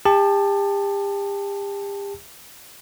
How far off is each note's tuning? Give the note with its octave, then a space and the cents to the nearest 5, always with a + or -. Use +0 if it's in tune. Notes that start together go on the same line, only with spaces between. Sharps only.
G4 +35 A5 +0